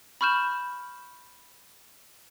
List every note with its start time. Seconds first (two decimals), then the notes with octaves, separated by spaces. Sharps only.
0.21 B5 C#6 F6 G6 E7